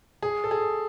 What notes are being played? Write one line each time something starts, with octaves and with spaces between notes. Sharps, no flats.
G#4
A4
G#4